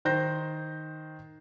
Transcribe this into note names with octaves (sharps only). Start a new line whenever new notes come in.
D#3 C5 G6 A#6